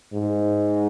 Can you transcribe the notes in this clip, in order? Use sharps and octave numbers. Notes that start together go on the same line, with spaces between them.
G#2